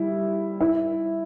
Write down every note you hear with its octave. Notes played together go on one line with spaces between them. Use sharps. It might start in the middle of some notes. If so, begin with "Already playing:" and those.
Already playing: G3 E4
E4